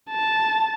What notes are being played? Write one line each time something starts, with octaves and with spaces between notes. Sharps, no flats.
A5